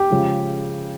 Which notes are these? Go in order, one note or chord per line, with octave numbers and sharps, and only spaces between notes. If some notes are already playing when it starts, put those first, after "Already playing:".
Already playing: G4
C#3 F3 G#3